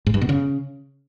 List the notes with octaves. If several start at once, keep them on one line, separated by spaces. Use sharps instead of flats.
G#2
G2
B2
C#3